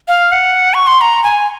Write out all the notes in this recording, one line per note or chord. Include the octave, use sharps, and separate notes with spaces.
F5
F#5
C#6
C6
A#5
G#5